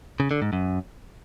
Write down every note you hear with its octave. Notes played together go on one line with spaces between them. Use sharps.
C#3
D3
G#2
F#2